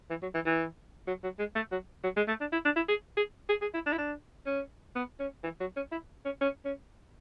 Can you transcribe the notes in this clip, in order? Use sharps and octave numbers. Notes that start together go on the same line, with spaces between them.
E3
F#3
E3
E3
F#3
F#3
G#3
A3
F#3
F#3
G#3
A3
D4
E4
D4
E4
G#4
G#4
G#4
G#4
E4
D4
E4
D4
C#4
B3
C#4
E3
F#3
C#4
E4
C#4
C#4
C#4